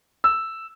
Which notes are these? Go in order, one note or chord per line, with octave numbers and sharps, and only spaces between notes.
E6